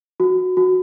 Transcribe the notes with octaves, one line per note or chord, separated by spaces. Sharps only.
F#4
F#4